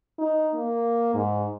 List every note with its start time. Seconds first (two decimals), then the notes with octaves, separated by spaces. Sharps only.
0.19 D#4
0.55 A#3
1.15 G#2